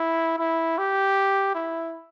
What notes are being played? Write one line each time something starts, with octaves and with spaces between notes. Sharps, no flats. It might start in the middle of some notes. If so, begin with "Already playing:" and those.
Already playing: E4
E4
G4
E4